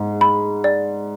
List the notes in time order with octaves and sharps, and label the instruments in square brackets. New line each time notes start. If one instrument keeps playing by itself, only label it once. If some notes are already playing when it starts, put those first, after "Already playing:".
Already playing: [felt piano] G#2
[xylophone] B5
D5